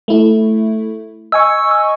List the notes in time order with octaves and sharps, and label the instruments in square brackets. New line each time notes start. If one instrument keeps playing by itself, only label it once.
[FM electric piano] A3 E4
[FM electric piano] D#5 G#5 C#6 [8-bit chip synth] E6